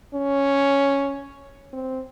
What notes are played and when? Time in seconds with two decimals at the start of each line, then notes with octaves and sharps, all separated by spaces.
0.14 C#4
1.73 C4